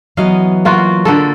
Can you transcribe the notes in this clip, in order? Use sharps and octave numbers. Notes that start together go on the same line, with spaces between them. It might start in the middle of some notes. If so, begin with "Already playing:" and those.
E3 F#3 B3 D#5 F5
A#3 F4 F#4
D3 A#3 A4